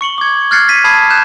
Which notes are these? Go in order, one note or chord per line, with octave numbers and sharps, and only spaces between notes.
C#6 C#7 F#7 G7
D6 G#6
F6 F#6 G#6 A6 C7 C#7
A6 B6 D#7
A5 B5 D#6 G#6 C7
F#6 G6 E7